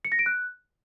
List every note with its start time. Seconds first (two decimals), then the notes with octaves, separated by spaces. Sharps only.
0.05 C#7
0.12 A#6
0.19 D7
0.26 F#6